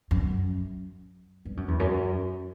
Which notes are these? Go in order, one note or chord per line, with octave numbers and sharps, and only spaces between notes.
F#2
G2
F#2
E2
F#2